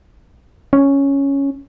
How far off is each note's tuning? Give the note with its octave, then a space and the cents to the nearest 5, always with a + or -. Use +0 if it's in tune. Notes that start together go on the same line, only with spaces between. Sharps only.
C#4 +0